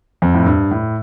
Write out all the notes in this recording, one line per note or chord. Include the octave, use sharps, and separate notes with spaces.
F2
A2
G2
A2